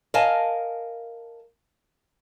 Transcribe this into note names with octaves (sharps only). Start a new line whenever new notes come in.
A#4 D#5 F5 G#5 A5